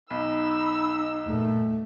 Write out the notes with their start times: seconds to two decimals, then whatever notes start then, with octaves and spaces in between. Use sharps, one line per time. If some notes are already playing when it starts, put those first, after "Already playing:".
0.10 B1 D#4 B5 E6
1.26 E2 G2 A#2 A3